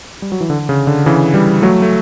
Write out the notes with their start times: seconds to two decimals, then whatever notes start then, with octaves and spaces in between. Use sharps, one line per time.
0.22 G3
0.32 F#3
0.41 E3
0.50 D3
0.69 C#3
0.87 D3
1.06 C#3 E3
1.34 E3 G3
1.62 F#3 A3
1.82 A3